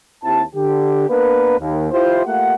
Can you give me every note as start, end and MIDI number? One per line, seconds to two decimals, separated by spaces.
0.24 0.43 39
0.24 0.43 60
0.24 0.43 64
0.24 0.43 67
0.24 0.43 81
0.55 1.06 50
0.55 1.06 67
1.09 1.57 58
1.09 1.57 59
1.09 1.57 62
1.09 1.57 70
1.09 1.57 71
1.59 1.89 39
1.92 2.25 64
1.92 2.25 65
1.92 2.25 67
1.92 2.25 72
2.26 2.54 57
2.26 2.54 58
2.26 2.54 65
2.26 2.54 67
2.26 2.54 78